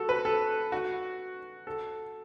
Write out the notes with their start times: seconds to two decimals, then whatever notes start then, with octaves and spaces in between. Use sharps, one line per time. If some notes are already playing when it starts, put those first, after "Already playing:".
Already playing: F#4 A4
0.09 B4
0.25 A4
0.72 F#4
1.67 A4